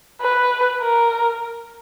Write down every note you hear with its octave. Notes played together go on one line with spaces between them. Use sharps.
B4
A#4